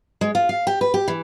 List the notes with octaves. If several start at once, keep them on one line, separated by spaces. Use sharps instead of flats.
G#3
F4
F5
G4
B4
G4
E3